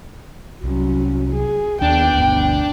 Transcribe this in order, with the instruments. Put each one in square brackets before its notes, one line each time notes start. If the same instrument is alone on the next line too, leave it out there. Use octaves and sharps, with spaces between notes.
[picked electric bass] C2 [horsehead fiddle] F#3 C#4
[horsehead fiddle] G#4
[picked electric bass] D#2 [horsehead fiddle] B3 G5 [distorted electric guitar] D4
[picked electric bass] G1 D2